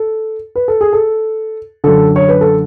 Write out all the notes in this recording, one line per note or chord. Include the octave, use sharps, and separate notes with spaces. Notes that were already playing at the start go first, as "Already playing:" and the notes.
Already playing: A4
B4
A4
G#4
A4
F#2 D3 A4
C#5
B4
A4